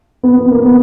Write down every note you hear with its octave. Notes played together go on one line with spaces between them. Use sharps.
B3
B3
A#3
B3